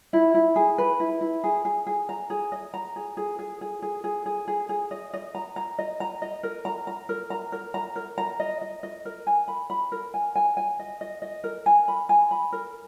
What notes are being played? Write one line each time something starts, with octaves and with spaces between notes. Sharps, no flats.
E4
E4
G#4
B4
E4
E4
G#4
G#4
G#4
A#5
G#4
D#5
A#5
G#4
G#4
G#4
G#4
G#4
G#4
G#4
G#4
G#4
D#5
D#5
A#5
A#5
D#5
A#5
D#5
A#4
A#5
A#5
A#4
A#5
A#4
A#5
A#4
A#5
D#5
D#5
D#5
A#4
G#5
B5
B5
A#4
G#5
G#5
G#5
D#5
D#5
D#5
A#4
G#5
B5
G#5
B5
A#4